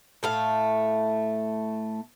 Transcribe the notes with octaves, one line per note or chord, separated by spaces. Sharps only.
A2 A3 F5